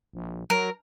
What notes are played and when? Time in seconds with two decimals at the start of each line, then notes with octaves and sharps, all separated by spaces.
0.13 A#1
0.50 F#3 A#4